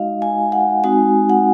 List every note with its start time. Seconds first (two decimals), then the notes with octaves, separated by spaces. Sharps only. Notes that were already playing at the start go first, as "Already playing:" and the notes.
Already playing: G#3 D#4 F#4 D#5 F5
0.22 G#5
0.52 F#5
0.84 G#3 C4 D#4 F#4 G#5
1.30 F#5